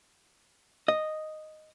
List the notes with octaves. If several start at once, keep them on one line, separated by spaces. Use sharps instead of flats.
D#5